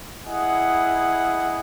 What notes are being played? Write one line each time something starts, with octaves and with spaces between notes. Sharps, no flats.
E4 G#4 D#5 F#5